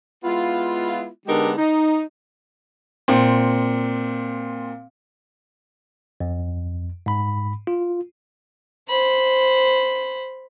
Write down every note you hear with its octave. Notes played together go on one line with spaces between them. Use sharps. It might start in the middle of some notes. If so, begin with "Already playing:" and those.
G#3 B3 E4 F4
D3 G#3 B3 D#4 G4 A#4
D#4
A#2 C4
F2
G#2 B5
F4
C5 B5